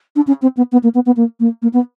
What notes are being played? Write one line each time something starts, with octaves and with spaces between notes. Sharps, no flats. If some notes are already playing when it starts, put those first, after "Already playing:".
D4
C#4
C4
B3
B3
A#3
B3
B3
A#3
A#3
A#3
B3